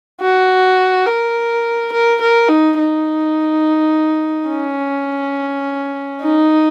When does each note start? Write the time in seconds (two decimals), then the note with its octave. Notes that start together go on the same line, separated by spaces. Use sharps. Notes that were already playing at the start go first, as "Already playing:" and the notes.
0.21 F#4
1.06 A#4
1.92 A#4
2.21 A#4
2.49 D#4
2.78 D#4
4.49 C#4
6.21 D#4